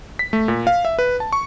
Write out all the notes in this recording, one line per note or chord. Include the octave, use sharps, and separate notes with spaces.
B6
A3
A#2
F5
E5
B4
A5
C#6